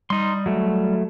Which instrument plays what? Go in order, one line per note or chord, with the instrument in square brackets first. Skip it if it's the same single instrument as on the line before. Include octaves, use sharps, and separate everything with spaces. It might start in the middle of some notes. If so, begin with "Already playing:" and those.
[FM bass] G3 [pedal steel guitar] D#4 C6
[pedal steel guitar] F#3 A3